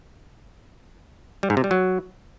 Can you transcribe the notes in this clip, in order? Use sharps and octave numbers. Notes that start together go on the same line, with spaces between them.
G3
G#2
C3
G3
F#3